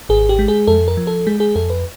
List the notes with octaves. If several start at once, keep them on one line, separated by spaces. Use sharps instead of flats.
G#1 G#4
G4
G#3
G#4
F2 A4
A#4
F3
A4
G#3 G#4
G#4
F2 A4
B4